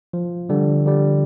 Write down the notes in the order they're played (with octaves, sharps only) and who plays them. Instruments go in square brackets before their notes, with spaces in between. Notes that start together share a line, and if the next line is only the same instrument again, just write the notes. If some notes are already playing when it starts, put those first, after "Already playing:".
[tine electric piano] F3
D3 G3
D3 G3